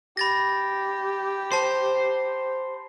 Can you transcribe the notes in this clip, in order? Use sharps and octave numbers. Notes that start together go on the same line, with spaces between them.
G4 B5 A6 A#6
C5 A5 C7